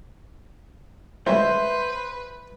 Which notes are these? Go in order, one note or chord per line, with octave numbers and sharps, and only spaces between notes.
F#2 G#3 C4 B4 C5 E5